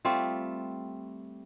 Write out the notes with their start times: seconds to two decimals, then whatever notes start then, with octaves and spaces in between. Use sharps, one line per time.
0.05 G3 A3 C4 F4